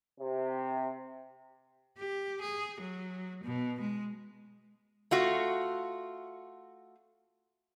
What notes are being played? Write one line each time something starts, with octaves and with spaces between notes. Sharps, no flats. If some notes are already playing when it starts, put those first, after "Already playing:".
C3
G4
G#4
F#3
B2
G#3
A3 F4 F#4